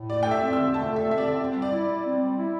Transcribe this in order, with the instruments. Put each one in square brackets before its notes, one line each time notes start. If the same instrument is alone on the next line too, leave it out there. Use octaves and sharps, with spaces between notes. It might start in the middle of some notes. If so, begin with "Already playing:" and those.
Already playing: [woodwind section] A2
[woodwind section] A3 [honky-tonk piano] D5
[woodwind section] A4 [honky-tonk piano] G5
[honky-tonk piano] E5
[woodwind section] C4
[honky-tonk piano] E6
[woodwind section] D3
[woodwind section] A3 [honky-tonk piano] A5
[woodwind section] A4 [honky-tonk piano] E5
[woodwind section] C4 [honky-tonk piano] E5
[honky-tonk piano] D5
[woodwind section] D3
C4
G3
[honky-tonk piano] D5
[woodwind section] E4
G3
C4
G3
E4